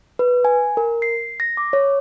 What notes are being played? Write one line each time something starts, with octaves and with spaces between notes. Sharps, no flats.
B4
G#5
A#4
C7
A#6
D6
C#5